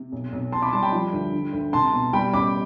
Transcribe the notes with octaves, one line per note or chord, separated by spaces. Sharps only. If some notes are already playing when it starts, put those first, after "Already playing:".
Already playing: C3
B1
B1
C3 A5 C6
B5 D6
G3 A5 C6
G5 B5
F3
D2
D3
D2
C2 A5 C6
B2
G3 G5 B5
A1 B5 D6